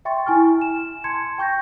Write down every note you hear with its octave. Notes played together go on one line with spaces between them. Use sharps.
E5 G5 C6 C#6 A6
E4 G#5 C#6 F6
E7
A5 C6 G#6 C#7
G5 C#6 G6 A#6